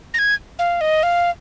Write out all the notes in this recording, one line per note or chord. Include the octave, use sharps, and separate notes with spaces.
A#6
G#6
F5
D#5
F5